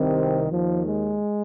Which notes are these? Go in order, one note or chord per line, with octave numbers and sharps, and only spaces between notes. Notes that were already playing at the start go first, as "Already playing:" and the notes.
Already playing: C2 C3 D#3 C4
D#2 D#3 F3
G#3